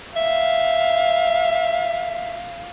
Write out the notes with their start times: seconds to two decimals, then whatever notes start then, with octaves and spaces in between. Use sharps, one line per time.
0.16 E5 F5